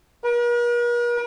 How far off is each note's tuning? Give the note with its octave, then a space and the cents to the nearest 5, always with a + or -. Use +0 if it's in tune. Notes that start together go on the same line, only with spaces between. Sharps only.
A#4 +45